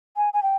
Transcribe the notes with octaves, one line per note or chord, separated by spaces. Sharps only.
G#5
G#5
G5